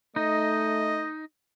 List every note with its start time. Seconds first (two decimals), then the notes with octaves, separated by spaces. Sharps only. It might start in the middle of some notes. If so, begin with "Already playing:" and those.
0.16 A3 D#4 D#5